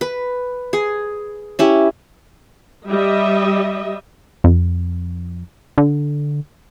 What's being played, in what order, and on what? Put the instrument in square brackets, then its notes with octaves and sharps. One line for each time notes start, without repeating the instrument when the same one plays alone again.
[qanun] B4
G#4
C#4 E4 G4
[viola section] G3 D#5 E5
[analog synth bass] F2
D3